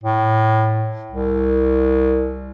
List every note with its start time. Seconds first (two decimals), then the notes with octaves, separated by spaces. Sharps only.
0.03 A2
1.10 C2